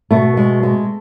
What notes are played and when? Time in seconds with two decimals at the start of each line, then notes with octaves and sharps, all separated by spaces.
0.11 B2 A3
0.37 G#3
0.63 G#3